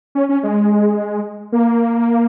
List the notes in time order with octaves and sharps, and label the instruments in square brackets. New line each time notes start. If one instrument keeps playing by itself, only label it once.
[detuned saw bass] C#4
C#4
G#3
A#3